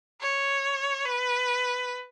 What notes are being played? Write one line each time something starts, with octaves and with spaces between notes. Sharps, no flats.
C#5
B4